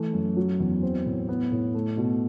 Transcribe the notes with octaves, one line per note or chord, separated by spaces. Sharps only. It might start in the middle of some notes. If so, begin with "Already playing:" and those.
Already playing: E3 A3
F#2
F#3
E2
C4
A2
B3
A2
A3
B2